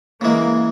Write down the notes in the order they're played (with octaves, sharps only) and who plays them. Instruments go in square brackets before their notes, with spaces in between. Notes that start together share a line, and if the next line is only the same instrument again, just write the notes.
[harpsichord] C#3 E3 G#3 [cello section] A#3